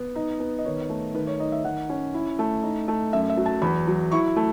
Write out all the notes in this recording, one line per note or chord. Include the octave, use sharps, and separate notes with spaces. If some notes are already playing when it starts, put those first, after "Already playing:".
Already playing: B3
D#4 D#5
B3
D#5
D#3 C#5
A3
D#3 B4
C#5
D#4 D#5
E5
D#3 F#5
C#4
E4
A3
D#4
A3
F#2 E5
E5
F#3
A5
E2 B5
F#3
E4 C#6
A3